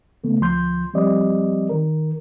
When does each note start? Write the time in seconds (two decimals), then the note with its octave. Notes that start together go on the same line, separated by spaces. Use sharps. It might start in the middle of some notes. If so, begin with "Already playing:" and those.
0.24 C#3 A3 B3
0.41 D2 F3 C6 G6
0.94 F3 G3 C4 G4 D5 D#5
1.69 D#3 A#4